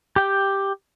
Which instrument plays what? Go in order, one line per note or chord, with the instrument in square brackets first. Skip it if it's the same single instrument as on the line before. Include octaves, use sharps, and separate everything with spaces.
[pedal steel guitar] G4 G5